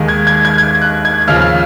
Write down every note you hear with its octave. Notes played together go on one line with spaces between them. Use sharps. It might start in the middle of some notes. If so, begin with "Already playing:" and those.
Already playing: D#2 D#3 G#3
G#6
G#6
G#6
G#6
F#6
G#6
D#2 C#3 F3 F6